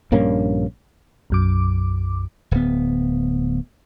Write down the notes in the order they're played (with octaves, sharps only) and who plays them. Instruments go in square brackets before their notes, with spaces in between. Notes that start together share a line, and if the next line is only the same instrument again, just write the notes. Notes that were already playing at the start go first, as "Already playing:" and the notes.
[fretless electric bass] A#1 G2 A#3 C#4
[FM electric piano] B1 F#2 D6
[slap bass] D1 B3